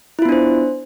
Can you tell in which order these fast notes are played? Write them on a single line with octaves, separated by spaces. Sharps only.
E4 F4 B3 D4 C5